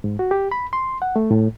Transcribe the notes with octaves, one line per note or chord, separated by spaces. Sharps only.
G#2
F#4
G4
B5
C6
F#5
A3
A2